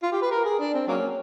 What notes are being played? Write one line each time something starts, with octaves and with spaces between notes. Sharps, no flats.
F4
G4
B4
A#4
G#4
D4
C4
F#3 A#3 C#4